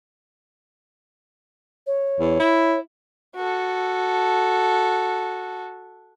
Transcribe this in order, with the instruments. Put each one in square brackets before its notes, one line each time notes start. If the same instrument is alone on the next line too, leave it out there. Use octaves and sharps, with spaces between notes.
[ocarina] C#5
[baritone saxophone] E2
E4
[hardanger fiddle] F#4 A4